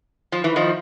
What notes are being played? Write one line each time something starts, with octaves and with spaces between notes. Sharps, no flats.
F3
E3
D#3 F3